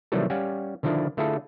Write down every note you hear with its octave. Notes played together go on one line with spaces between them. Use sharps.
C3 D#3 E3 F#3 G3 A3
G3 C#4 G4 F5 F#5 G#5
D3 D#3 F3 D4 E4
D3 A3 E4 F4 G#4 A4